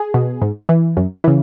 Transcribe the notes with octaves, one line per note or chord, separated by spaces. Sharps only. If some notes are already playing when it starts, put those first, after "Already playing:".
Already playing: G#4
B2
G#2
E3
F#2
C#3 E3